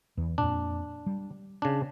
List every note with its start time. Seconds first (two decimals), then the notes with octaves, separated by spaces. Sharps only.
0.17 E2 E3
0.38 F2 A#2 D4
1.06 G3
1.62 C#3 D4